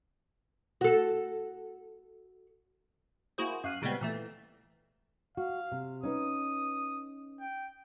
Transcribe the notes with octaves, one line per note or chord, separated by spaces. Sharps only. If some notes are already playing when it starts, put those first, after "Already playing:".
F#4 A4
A#3 E4 F#4 G#4 C5
F#2 F5 F#6 D#7
A#2 C#3 G3 G#3 B3 C4
A#2 E3 A3
F#4 F5
C3
C#4 D#4 B4 D#6
G5